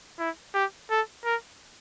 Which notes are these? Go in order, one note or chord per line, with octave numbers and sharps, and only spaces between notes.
E4
G4
A4
A#4